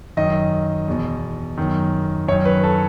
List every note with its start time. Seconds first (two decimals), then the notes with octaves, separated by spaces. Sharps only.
0.17 F#2 D#3 D#5
0.88 E2 B2
1.57 F#2 D#3
2.28 F#2 D#3 C#5
2.45 B4
2.64 A4